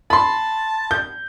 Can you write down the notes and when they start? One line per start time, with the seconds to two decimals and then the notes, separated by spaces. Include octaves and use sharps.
0.10 A5 B5 C6
0.91 G6